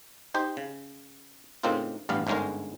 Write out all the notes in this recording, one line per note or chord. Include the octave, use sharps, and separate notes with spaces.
D#4 G4 C5
C#3
A2 C#3 A#3 C4 D#4 F4
A1 G2 B3 F5
G1 G#2 D3 G#3 C#4 A#4